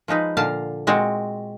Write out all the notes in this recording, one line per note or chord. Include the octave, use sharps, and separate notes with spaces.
F3 G#3 D#4 B4
A#2 D3 F5 A5
A#2 G#3 C4 F#4